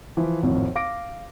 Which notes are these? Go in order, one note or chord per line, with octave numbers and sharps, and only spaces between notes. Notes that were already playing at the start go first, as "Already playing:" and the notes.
E3 F3
G#1 F2 A2
F5 D6 A#6 D7